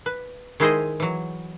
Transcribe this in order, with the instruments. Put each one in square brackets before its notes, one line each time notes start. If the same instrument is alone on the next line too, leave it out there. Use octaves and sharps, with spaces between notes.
[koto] B4
D#3 G#3 E4 G#4 C5 D#5
E3 F#3